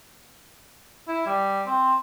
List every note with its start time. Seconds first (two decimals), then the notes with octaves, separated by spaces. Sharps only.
1.08 E4
1.26 G3
1.66 C4